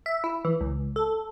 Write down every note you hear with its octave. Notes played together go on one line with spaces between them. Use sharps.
E5
E4
E3
C#2
A4